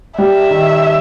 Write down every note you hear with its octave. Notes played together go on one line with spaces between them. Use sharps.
G3 E5
D#3